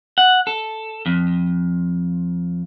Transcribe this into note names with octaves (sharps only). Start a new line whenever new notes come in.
F#5
A4
F2